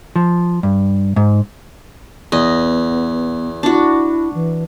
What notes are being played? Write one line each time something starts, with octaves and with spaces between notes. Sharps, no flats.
F3
G2
G#2
E2 B3 D#5
D4 E4 F#4
E3